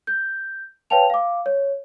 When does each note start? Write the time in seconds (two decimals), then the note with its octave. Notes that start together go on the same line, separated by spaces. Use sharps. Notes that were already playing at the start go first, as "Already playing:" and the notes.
0.07 G6
0.90 B4 C#5 F5 G5 A5 F7
1.10 F5 D6
1.46 C#5